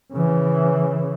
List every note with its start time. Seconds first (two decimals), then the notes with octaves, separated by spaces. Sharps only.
0.12 C#3 E3